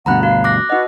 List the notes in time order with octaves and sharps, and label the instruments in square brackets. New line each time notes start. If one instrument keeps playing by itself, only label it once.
[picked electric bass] D2 G2 B2 [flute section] F#5 [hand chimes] A#5 B5 F#6
[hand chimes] F#4 [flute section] F5
[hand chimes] D6 F#6 A#6
[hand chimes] D#4 D#5 [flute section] F#4 B4 F#5